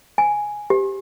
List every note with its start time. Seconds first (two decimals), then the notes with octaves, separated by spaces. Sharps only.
0.18 G#5
0.70 G4